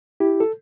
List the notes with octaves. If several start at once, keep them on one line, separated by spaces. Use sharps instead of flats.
E4 G4
A4